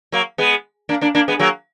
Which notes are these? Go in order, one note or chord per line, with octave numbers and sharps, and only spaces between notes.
F#3 A#3
G#3 B3
A#3 D4
A#3 D4
A#3 D4
G#3 B3
F#3 A#3